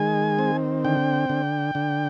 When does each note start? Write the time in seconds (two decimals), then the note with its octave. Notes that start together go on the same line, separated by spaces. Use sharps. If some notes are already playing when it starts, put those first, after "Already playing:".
Already playing: D#3 G#3 G#5
0.39 C4
0.84 D3 G5
1.30 D3
1.75 D3